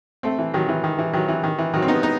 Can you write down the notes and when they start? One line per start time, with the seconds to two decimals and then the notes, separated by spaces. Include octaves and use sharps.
0.23 A3 C4
0.39 E3
0.54 D#3 F#3
0.69 E3
0.84 D#3
0.99 E3
1.13 D#3 F#3
1.28 E3
1.44 D#3
1.58 E3
1.74 D#3 F#3
1.82 C4
1.88 B3 D#4
2.03 B3 D#4